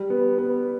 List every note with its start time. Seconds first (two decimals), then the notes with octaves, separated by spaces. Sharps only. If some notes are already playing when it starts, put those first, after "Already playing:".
Already playing: G3
0.10 B3
0.38 B3